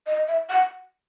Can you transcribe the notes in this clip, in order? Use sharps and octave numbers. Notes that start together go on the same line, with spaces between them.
D#5
E5
F#5